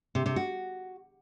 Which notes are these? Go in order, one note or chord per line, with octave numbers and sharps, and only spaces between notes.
C3
C3
F#4